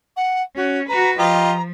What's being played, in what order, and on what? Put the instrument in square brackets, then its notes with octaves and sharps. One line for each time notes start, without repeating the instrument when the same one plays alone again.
[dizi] F#5
[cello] C#4 [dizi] F#4
[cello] F#4 B4 [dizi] A#5
[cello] F3 [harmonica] F4 G4 D#5 [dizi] A#5